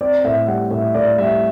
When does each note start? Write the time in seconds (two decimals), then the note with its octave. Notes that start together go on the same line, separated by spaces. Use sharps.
0.01 C4 D5
0.25 A2 E5
0.47 G3 F#5
0.71 A2 E5
0.94 A2 D5
1.18 G3 E5